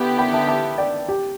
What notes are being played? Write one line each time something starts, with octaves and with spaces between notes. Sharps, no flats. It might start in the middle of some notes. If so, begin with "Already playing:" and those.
Already playing: D3 B3 E4 G4 G5
G5 B5
E5 A5
E5 A5
D5 G5
G4